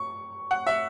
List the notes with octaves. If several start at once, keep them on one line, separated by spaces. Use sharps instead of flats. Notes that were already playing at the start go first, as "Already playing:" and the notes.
Already playing: C#6
F#5
E5